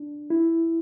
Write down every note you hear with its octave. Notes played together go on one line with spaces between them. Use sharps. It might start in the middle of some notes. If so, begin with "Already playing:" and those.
Already playing: D4
E4